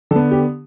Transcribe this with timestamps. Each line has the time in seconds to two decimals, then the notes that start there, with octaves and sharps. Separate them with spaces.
0.11 D3 A4
0.16 B3
0.31 G4